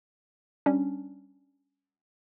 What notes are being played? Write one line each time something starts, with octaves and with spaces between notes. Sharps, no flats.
G3 C#4 D4